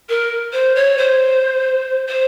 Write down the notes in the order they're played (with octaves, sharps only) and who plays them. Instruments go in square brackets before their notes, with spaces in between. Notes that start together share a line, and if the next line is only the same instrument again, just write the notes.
[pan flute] A#4
C5
C#5
C5
C5